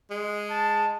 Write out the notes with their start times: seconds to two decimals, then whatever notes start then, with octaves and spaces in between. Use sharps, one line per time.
0.10 G#3
0.50 A5